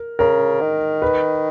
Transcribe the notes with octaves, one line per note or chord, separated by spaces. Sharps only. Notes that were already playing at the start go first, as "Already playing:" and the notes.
Already playing: A#4
C#3 A#4
D#3
B4